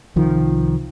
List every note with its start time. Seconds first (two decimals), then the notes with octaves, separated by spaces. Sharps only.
0.16 C2 D#3 F3